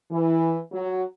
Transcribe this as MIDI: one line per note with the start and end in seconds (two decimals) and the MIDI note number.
0.10 0.57 52
0.72 1.03 54